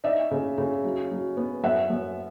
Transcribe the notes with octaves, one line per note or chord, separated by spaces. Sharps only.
D#4 D5 E5
C#3
C#3
F#3
F#3
B3
F#2 E5 F#5
F#2